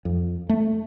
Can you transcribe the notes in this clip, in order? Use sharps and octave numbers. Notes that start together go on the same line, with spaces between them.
F2
A3